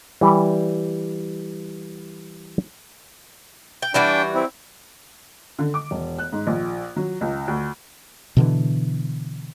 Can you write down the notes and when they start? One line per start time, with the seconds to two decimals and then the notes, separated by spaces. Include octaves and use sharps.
0.21 E3 G3
3.82 G5
3.94 E3 G3 D4 F#4 G5
4.35 C4 E4
5.59 D3
5.74 D6
5.91 E1
6.19 F#6
6.32 G#2
6.47 A#1
6.96 F#3
7.21 C#2
7.48 D2
8.37 B2 D3 E3